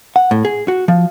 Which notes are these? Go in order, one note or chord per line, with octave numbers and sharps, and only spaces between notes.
F#5
A2
G#4
F#4
F3